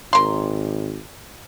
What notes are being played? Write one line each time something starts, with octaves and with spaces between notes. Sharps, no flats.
G#1 A#4 C6